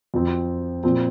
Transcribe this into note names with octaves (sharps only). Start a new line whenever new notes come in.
F2 F3 C4
A#2 F3 C4